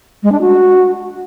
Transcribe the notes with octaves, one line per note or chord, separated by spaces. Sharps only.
G#3
D4
F#4